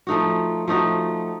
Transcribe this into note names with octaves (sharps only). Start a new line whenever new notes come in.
F3 A3 D#4 F#4
F3 A3 D#4 F#4